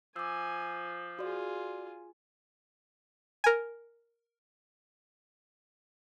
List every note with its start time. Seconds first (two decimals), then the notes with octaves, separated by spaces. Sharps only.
0.16 F3 G#5 D6 E6
1.19 F4 F#4 G#4 D5
3.44 A#4 G#5